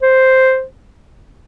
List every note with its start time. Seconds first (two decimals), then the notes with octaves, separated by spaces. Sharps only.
0.03 C5